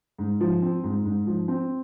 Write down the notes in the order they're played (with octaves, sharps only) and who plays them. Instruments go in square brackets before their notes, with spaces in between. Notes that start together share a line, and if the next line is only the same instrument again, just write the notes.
[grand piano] G#2
F3
C4
G#2
G#2
F3
C4